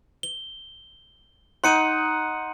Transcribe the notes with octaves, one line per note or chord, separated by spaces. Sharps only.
G7
D#4 F#5 C6 C#7 D#7